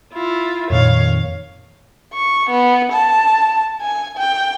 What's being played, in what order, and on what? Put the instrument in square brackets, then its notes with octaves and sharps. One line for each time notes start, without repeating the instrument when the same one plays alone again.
[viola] E4 F4
[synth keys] F2 A#2 D#3 [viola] C#5 F5
[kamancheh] C#6
B3
A5
G#5
G5